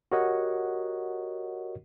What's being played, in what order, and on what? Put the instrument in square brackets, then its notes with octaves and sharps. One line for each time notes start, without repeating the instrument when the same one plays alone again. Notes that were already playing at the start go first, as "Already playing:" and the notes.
[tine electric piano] F#4 G4 A#4 C#5 D#5 F#5